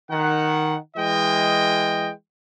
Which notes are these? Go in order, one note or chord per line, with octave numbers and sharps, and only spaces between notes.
D#3 F#5
E3 G#3 D#5 G5